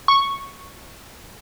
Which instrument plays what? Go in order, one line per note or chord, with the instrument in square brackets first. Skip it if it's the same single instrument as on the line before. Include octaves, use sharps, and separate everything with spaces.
[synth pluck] C#6